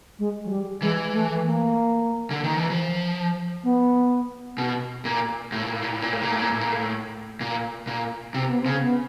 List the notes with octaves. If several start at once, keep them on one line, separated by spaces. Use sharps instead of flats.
G#3
F#3
G3
E3 G#3
A3
A#3
D3
D#3
E3
F3
B3
B2
A#2
A2
A#2
A2
A#2
A2
A#2
A2
A#2
A2
A#2
A2
A#2
A2
A#2
A#2
C3 C4
B3
C4
C#3
B3